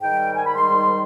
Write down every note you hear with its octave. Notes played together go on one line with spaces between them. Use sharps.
G#2 D#3 G3 G5
G#5
B5
C6